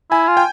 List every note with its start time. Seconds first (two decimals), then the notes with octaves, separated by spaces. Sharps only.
0.11 E4 G#5
0.28 F4
0.37 G5